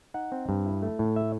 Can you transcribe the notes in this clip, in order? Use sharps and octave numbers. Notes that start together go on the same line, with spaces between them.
D#4 F#5
C4
G2
E4
A3
A2
E5